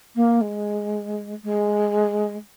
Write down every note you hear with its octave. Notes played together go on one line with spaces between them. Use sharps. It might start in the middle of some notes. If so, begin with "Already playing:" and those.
A#3
G#3
G#3